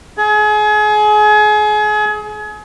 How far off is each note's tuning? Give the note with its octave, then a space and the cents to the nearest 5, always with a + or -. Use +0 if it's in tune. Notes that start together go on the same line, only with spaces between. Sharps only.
G#4 +30